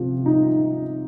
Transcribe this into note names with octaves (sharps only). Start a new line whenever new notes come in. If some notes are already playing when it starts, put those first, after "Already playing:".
Already playing: C3 F3
D#4